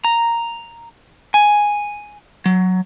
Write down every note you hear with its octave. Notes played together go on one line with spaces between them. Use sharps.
A#5
G#5
F#3